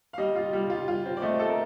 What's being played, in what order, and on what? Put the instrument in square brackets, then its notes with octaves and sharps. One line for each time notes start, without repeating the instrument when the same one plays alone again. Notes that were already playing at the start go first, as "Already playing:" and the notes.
[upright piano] F5
[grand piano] G3 [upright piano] D#5
[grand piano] F4
G3
F4
F4
C4
[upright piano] D5
[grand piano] A3 [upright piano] D#5
[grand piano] A4
[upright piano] A#4